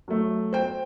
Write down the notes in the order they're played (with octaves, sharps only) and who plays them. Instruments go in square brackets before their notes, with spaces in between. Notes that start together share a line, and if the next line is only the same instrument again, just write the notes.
[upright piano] F#3 A3
[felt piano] C5 G5